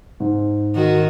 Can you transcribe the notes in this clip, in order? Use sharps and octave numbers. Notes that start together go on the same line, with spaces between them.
G#2
D#3 F#4